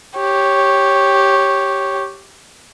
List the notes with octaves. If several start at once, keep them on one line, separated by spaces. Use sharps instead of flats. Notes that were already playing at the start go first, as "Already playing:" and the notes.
G4 C#5